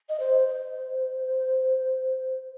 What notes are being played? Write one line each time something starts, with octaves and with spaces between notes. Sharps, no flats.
D#5
C5
C5